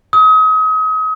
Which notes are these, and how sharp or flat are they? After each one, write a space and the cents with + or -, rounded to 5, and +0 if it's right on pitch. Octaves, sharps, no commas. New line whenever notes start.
D#6 +35